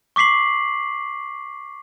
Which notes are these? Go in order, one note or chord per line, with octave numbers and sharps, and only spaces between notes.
C#6 D6 B6 C7 F#7